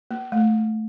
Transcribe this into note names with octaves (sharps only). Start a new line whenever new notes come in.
A#3
A3